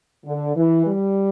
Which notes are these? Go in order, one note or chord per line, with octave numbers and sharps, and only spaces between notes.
D3
E3
G3